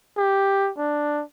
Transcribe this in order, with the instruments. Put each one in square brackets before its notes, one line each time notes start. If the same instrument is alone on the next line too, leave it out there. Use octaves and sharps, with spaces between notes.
[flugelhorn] G4
D4